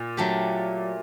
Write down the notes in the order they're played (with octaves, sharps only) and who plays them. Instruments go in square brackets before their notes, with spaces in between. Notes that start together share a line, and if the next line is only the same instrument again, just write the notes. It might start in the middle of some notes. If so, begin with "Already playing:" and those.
Already playing: [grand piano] A#2
[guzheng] F#3 A3 D4 G4